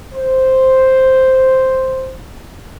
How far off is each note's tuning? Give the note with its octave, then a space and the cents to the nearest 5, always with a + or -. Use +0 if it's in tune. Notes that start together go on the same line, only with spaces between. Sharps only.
C5 +0